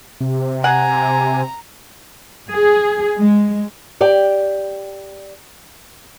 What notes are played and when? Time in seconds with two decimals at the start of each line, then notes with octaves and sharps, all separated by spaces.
0.20 C3
0.64 F#5 G#5 A#5
2.50 G#4
3.17 G#3
4.01 G4 D5 G5